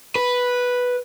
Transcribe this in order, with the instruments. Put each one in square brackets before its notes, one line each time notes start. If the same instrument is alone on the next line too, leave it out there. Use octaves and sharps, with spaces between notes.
[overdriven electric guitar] B4